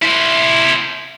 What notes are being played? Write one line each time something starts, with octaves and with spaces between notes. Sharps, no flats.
E4 C5